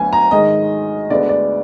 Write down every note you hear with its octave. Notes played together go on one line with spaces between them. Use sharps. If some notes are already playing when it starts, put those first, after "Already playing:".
Already playing: D2 D3 F#3 B3 G#5
A#5
G#2 D#3 G#3 D#5
D2 D3 G#3 B3 D4 D5
D5